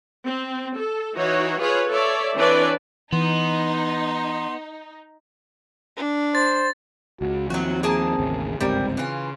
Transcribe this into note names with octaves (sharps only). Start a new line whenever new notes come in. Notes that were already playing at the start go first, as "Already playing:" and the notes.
C4
A4
E3 D#4 F#4 C#5
F4 G#4 B4 C#5
A4 C#5 D5 E5
E3 C4 D4 B4 C#5 D5
E3 B3 D#4 C6
D4
C5 A6
C#2 C#3 F#4
D#2 F3 F#3 C4 F#4
A#3 G#4 A5
A1 D#2 C#3
G1 C#2 G#2 G3 C4 A#4
C#3 E3 F4